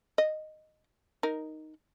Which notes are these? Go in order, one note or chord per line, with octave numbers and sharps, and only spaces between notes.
D#5
D#4 A#4